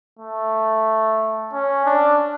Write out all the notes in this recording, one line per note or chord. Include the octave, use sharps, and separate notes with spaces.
A3
C#4
D4